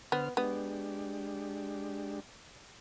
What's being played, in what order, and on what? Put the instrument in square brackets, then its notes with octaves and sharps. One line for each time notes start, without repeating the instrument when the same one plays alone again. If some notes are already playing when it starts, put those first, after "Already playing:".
[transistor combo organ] D3 C5 F6 [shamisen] B3
[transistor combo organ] G#3 D4 G4 [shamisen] B3